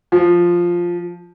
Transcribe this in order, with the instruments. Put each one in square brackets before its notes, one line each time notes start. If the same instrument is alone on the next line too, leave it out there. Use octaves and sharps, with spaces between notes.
[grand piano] F3